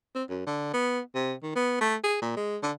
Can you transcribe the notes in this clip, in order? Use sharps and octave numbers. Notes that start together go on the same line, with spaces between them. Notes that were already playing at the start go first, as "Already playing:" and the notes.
C4
F#2
D3
B3
C3
D#3
B3
A3
G#4
A#2
G#3
D3